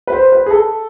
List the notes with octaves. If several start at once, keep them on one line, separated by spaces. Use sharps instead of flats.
B4
C5
B4
G#4
A4